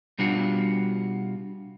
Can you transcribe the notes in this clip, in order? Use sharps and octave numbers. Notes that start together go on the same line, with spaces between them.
B2 G3 D4 F4 F#4